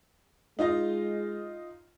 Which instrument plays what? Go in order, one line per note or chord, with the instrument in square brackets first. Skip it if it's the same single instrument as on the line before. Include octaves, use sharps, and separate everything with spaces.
[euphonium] G#3 [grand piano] D#4 F4 D#5